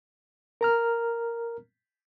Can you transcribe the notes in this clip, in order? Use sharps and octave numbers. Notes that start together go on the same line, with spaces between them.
A#4 A#5 F6